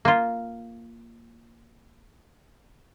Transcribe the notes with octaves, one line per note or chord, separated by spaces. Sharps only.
A#3 F4